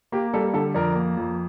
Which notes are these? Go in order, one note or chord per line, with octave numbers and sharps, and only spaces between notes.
A#3 G4
G3 A4
D3 A4
F2 A#4 D5
A#3
F2